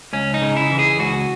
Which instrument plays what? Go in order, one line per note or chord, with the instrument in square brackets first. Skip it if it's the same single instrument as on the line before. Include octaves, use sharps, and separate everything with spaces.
[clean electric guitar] C#2 C#4
D#4
C#3
E4
E3
G#4
C#2 F#4